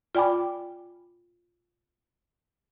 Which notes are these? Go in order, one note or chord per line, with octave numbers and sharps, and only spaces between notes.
F4 D5 G5 G#5 B5 D6